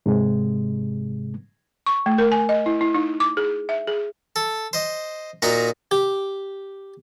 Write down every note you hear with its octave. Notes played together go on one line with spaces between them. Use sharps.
G#2 C3 G#3
C#6
A3
A#4
G#5
D#5
E4
E4
D#4
D6
G#4
E5
G#4
A4
C5 D#5
A#2 D#4 F#4 D#5 A#5
G4